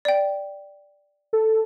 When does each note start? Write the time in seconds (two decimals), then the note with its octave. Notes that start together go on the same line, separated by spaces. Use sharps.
0.05 D5 G5
1.33 A4